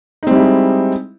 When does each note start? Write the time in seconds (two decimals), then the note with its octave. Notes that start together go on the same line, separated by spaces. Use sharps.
0.23 D#4
0.27 C4
0.31 G3
0.35 E4
0.40 G#3